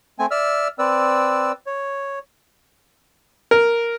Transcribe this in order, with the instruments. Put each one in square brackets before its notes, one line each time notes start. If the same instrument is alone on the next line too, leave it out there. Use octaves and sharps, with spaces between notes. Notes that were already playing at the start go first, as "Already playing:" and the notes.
[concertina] A3 C4 G#5
D5 E5 E6 F6
C4 B4 D5 E6
C#5
[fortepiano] A#4